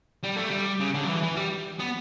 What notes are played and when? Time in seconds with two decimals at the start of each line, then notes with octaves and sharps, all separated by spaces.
0.24 G3
0.37 A3
0.51 G3
0.80 C#3
0.94 D3
1.04 F#3
1.09 E3
1.23 E3
1.36 G3
1.79 B3